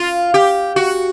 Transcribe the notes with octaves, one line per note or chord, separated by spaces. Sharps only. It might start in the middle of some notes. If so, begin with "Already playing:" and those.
Already playing: F4
G4
F#4